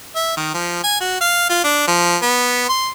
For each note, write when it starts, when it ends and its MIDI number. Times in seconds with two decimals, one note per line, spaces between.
0.16 0.36 76
0.37 0.50 51
0.54 0.82 53
0.84 0.99 80
1.01 1.20 66
1.21 1.44 77
1.50 1.59 65
1.64 1.83 62
1.87 2.17 53
2.22 2.64 59
2.68 2.90 84